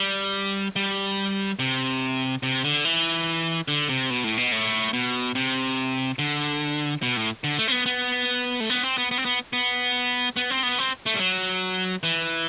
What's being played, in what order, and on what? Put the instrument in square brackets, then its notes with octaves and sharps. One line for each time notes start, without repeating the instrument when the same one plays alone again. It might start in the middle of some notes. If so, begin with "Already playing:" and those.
Already playing: [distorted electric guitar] G3
G3
C3
C3
D3
E3
D3
C3
B2
A2
B2
A2
B2
C3
D3
B2
A2
D3
A3
C4
B3
B3
A3
B3
C4
B3
B3
C4
B3
B3
B3
C4
B3
C4
A3
G3
F#3
E3